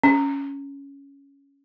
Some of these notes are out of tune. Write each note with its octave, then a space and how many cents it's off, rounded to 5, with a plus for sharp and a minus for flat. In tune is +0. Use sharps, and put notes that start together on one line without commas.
C#4 +5